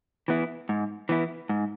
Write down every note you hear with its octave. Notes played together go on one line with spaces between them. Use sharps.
E3 B3 E4
G#2
E3 B3 E4
G#2